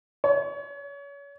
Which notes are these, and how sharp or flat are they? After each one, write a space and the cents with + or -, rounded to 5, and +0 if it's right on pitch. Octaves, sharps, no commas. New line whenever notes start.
C#5 +30